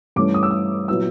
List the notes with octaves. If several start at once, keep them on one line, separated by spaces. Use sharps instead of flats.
G2 E3 A3 C#4 D6
D#6
E6
D#6
A#2 F#3 B3 E4 E6